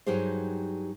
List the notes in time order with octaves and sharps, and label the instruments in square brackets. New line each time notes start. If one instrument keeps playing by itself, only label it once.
[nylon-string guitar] G2 F#3 D#4 G4 G#4 C5